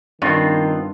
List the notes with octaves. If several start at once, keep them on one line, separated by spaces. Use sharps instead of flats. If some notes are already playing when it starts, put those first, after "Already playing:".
G2 D#3 B3 C4 F4